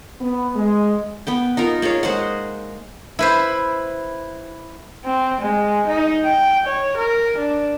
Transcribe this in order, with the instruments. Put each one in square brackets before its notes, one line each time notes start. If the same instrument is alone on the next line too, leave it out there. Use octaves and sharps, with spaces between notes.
[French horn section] B3
G#3
[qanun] B3 B4 G5
D#4 F4 A#4
A#3 F4 G#4 C#5
G#3 C5 D#5 F#5
[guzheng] E4 B4 C5
[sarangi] C4
G#3
D#4
G5
C#5
A#4
D4